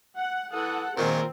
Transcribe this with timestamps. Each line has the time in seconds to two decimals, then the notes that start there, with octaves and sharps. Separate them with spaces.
0.16 F#5
0.53 E3 A4 F#5 D#6
0.98 A#2 D#3 G#3 C4 F4 A#4 C5